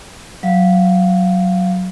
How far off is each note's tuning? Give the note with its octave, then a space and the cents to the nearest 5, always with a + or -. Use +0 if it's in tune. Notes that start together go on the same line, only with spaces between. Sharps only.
F#3 +0 F5 -15